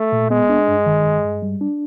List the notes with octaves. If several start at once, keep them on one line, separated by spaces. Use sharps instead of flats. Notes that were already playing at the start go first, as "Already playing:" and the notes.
Already playing: A3
A#2
G#3 B3
D4
G2
D#3
G2
G2
G3
D4